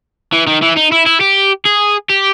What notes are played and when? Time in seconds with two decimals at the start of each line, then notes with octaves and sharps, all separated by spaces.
0.33 E3
0.47 D#3
0.62 E3
0.77 D#4
0.92 E4
1.06 E4
1.21 G4
1.65 G#4
2.10 G4